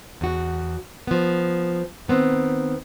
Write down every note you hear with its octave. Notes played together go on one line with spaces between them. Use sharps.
E2 F#4
F3 B3
D#3 B3 C4